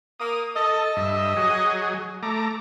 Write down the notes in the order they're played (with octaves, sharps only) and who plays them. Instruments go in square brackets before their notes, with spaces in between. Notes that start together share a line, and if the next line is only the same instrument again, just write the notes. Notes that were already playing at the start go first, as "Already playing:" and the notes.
[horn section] A#3 [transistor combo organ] D#6
[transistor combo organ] A4 [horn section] D#5
[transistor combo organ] G2 E5
F#3 G#4
A3 A#5 D6